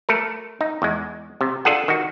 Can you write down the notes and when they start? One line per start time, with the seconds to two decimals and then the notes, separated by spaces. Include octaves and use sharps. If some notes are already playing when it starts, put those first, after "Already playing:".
0.09 A3 A4 A#4
0.61 D#4
0.82 E2 G#3
1.41 C3
1.65 D4 F4 G#4 A4 F#5
1.88 D#3 F#4